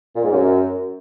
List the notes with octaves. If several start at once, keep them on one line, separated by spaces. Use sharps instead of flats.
A#2
G#2
F#2